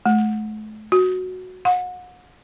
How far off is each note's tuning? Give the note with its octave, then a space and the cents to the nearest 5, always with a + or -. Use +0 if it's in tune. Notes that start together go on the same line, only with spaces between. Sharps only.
A3 -35
F#4 -5
F#5 -35